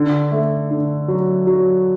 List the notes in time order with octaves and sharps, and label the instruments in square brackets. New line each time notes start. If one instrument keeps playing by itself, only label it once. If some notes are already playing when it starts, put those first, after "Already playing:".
Already playing: [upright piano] D3
A3
D3
F#3
F#3